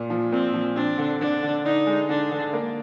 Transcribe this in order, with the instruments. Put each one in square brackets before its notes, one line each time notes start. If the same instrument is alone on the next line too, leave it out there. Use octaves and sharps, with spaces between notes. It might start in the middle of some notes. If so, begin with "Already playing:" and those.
Already playing: [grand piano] A#2
F3
[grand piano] A#2 [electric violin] C4
[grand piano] F3
[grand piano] C4 [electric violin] D4
[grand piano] D3
[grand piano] D3 [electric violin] D4
[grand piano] D3
[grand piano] D4 [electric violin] D#4
[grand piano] G#3
[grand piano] D3 [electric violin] D4
[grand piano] D3
A#3